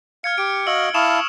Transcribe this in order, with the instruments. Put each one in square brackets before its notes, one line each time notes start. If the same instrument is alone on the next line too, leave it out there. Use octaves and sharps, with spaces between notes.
[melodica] F5 [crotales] F6 G#6 C#7
[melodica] G4 [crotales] D7
[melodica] F#4 D#5 F5 [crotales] E6 C#7 F#7
[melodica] E4 F5 A5 [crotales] C#6 D#6 E7